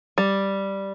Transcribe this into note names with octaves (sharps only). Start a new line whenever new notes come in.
G3